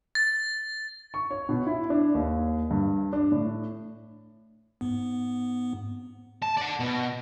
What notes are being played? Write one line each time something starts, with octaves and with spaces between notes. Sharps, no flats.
A6
C#6
C#5
B2
E4
D4
D#2
G2
D4
A2
G#2 B3
A5
D5 F#5
B2